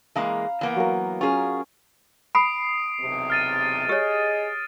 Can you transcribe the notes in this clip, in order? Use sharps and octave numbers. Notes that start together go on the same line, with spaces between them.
E3 G#3 A#3 F5 A#5 B5
E3 A#3 B3
F#3 A#4
C#4 F4 G#4
B5 D#6 C7 D7
B1 E2 C3
F6 A6 D#7
G4 G#4 C#5 D#5